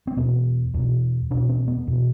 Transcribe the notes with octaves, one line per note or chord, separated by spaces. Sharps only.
C4
E2 B2 B3
E2 B2
E2 B2 D4
C4
B3
E2 B2